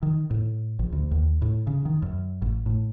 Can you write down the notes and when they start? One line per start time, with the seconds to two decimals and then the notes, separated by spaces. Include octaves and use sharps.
0.03 D#3
0.31 A2
0.79 A#1
0.92 D2
1.11 D#2
1.42 A2
1.67 C#3
1.85 D#3
2.02 F#2
2.42 A1
2.66 A2